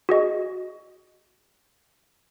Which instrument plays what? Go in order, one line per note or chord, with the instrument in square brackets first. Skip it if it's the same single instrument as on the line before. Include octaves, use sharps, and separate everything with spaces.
[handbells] F#4 G#4 D#5